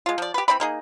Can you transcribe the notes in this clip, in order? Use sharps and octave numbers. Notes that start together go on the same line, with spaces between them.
G#3 F4
F3 D5
G4 B4
E3 C4 D5 B5
A#3 D#4 G#4